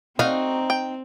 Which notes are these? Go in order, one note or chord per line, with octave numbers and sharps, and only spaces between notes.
C4 D#4 F#4 F5
G5